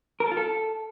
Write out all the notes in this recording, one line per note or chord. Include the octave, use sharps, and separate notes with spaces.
A#4
A4
F4
A4